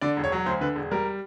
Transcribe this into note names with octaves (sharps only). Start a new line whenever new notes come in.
D3 D5
E1
C#5
F#3
D2 C5
D3 B4
E1
G3 A#4